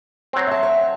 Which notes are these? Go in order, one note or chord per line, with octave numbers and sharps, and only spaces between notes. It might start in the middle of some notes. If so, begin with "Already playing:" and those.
F#3 C4
E5 A5
C#5